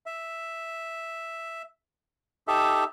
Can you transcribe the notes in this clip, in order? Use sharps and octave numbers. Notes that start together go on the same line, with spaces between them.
E5
D#4 G4 A4 E5